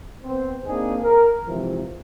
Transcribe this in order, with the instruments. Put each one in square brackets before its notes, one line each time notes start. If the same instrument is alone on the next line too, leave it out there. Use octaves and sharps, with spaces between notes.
[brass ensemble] B3 C4 C5
A#3 C4 D4 D#4 G#4
A#4
G#2 C3 E3 F3